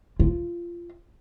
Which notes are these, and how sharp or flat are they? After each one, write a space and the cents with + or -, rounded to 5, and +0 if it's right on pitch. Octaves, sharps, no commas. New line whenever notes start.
F4 -20